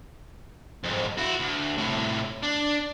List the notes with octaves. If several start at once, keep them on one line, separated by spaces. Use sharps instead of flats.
F2 G#2
E4 F#4
D2
A2 C3
D4